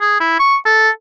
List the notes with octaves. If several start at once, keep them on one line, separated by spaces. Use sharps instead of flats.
G#4
E4
C#6
A4